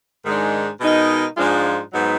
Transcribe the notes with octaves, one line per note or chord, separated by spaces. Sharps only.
G#2 D#3 G#3 D4
B2 G#3 D#4 A#4
G#2 F3 G#3 D4 F4
G#2 F#3 B3 D#4